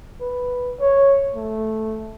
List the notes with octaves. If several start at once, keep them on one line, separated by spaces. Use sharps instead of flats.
B4
C#5
A3